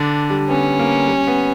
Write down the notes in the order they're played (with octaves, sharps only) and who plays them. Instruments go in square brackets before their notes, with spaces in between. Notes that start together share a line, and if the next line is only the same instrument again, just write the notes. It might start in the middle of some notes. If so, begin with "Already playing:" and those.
Already playing: [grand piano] D3 [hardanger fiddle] D4
[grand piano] G3
[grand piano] B3 [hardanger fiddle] C#4
[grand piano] A#3
G3
B3